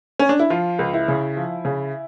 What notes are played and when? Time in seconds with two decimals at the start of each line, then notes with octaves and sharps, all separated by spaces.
0.19 C#4
0.29 D4
0.39 E4
0.50 F3 F4
0.79 C#2
0.94 E4
1.08 C#3
1.37 F3
1.65 C#3